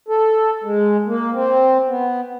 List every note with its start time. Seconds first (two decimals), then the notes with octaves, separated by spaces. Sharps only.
0.08 A4
0.64 G#3
1.07 A#3
1.33 C4
1.87 B3